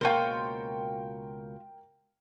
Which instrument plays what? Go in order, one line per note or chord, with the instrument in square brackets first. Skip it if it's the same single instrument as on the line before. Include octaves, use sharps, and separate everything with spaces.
[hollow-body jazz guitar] C#2 B2 A#3 [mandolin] F4 F#4 C5 [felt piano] A#4 G5